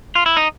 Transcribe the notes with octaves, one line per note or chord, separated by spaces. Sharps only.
F4
E4
D#4